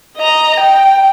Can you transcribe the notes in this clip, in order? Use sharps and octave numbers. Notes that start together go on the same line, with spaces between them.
D#5 A#5
G5